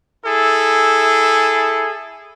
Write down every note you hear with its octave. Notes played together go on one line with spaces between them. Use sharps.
E4 G#4 A4